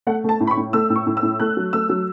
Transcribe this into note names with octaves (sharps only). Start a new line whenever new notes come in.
A3 F#5
A3 A5
A2
B5
C#6
A2
A3 E6
A2
C#6
A2
E6
A2
A3 F#6
F#3
A3 E6
F#3